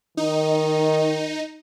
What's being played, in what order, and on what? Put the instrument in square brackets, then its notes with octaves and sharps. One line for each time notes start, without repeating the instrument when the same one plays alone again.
[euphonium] D#3 [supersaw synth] D#4